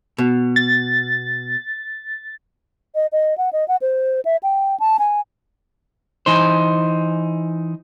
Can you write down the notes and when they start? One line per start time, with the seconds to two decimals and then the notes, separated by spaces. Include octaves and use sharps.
0.18 B2
0.56 A6
2.95 D#5
3.12 D#5
3.38 F#5
3.53 D#5
3.68 F#5
3.82 C5
4.25 E5
4.43 G5
4.80 A5
4.99 G#5
6.26 E3 D#4 C5